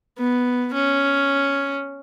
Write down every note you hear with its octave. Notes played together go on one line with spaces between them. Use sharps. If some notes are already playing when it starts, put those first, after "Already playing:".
B3
C#4